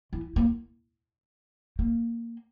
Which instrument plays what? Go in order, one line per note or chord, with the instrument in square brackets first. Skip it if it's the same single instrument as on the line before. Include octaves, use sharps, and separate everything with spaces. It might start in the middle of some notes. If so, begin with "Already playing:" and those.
[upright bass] E3
A#3
A#3